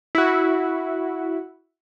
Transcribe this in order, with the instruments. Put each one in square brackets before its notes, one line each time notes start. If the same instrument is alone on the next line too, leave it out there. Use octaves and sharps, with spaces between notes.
[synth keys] E4 F#4